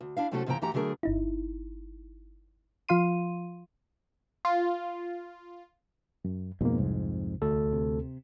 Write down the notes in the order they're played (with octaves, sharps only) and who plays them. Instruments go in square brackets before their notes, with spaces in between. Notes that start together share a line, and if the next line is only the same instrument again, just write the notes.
[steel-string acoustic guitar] D2
D4 E4 F5
C3 F#3 A3 C#4 F#4 A4
G#2 C#3 F3 C#4 G5 A#5
F#2 E3 A3 G4 F#5 A#5
D3 F#3 A3 G#4 A#4
[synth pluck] G1 D#4 E4
F3 F4 F5 C6 D#7
[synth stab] F4
[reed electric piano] F#2
[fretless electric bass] F2 G#2 [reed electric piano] B2 A#3
[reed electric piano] C2
[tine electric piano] D2 A4
[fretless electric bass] C3